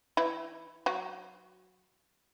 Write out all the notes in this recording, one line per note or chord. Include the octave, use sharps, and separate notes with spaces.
E3 E4
F#3 F#4